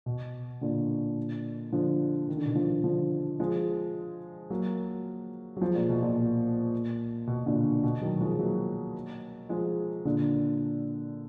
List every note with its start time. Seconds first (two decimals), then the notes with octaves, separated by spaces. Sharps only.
0.06 B2
0.61 A#2 D3
1.72 D3 F3
2.28 D#3
2.37 D3
2.45 B2 D#3
2.55 D3 F3
2.84 D3 F3
3.40 F3 G#3
4.50 F#3 A#3
5.56 F#3
5.61 F3 G#3
5.75 A#2
5.89 B2
6.03 A#2
6.16 A#2
7.27 B2
7.46 A#2 D3
7.83 B2
8.01 D#3 F#3
8.20 F3 G#3
8.39 F#3 A#3
9.49 F3 G#3
10.05 A#2 D3